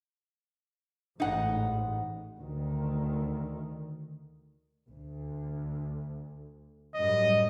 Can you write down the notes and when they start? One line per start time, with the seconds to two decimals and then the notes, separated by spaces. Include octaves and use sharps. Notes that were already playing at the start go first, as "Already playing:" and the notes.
1.20 A1 G#2 D#4 F#5
2.38 D2 D#3
4.88 D2
6.95 F#2 A2 G3 D#5